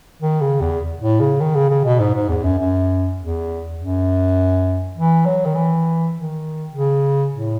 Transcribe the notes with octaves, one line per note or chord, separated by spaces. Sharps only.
D#3
C#3
E2
A2
C#3
D#3
C#3
C#3
B2
G#2
G#2
E2
F#2
F#2
E2
F#2
E3
F#3
D#3
E3
D#3
C#3
A2